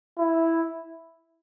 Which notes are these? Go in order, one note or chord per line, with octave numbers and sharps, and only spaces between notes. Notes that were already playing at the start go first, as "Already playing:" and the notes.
E4